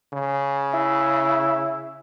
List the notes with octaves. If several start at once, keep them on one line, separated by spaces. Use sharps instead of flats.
C#3
E4